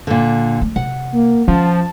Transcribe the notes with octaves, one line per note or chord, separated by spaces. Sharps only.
A#2 D3
A3
C3 F#5
A#3
F3 C#4 A5